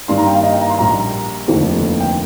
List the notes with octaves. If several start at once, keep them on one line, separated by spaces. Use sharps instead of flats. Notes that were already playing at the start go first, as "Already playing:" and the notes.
G2 D#3 G3 A#3 C6
A#5
G5
F5
D#5
G5
A#5
C6
A#1 A#2 G3 A#5
F1 D#2 D3 F3
G5